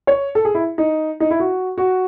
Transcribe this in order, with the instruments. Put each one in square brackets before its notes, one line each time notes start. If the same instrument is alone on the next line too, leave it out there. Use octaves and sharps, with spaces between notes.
[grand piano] C#5
A4
G#4
E4
D#4
D#4
E4
F#4
F#4